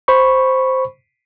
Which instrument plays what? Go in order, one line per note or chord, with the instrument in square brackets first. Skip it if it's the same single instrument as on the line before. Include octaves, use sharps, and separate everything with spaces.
[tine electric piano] C5 B5 C#6